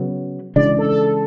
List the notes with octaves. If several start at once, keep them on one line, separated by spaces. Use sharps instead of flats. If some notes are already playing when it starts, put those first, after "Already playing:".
Already playing: C#3 F#3 B3
C#3 E3 G#3 D4 D5
A4
A4